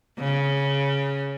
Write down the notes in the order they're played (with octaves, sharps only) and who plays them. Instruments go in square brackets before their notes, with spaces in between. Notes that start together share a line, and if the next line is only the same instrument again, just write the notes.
[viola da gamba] C#3